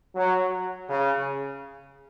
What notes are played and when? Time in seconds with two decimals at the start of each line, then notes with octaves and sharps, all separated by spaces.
0.15 F#3
0.89 C#3